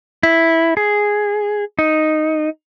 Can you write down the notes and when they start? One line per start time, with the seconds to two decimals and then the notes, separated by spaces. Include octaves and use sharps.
0.23 E4
0.77 G#4
1.79 D#4